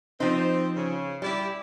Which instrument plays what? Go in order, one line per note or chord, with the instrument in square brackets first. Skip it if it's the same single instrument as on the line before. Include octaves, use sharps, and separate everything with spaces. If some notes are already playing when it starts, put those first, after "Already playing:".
[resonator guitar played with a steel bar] F3 D#4 [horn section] C4
[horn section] C#3
[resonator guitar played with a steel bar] G3 G4 [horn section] E4 D5